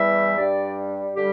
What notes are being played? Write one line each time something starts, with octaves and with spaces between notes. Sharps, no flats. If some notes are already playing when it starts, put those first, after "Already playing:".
Already playing: E2 E3 G3 E5
G2 G3 D5
D3 G3 G4